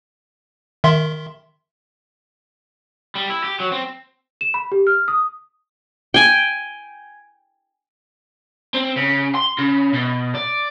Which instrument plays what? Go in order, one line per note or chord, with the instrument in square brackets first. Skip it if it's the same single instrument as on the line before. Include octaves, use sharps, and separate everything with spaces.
[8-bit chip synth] D#3 E5 C6
[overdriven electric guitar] G3
E4
G4
F#3
C4
[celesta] E7
B5
G4
F6
D#6
[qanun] G5 G#5
[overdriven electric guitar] C4
C#3
C6
C#3
B2
D5